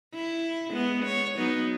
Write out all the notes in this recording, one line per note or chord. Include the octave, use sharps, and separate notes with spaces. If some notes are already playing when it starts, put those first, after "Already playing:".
E4
G#3 B3
C#5
F#3 B3 D#4